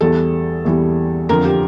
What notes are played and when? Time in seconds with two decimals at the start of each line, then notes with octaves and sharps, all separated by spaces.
0.01 E2 E3 G3 A4
0.65 E2 E3 G3
1.29 F2 D3 F3 A#4
1.45 G4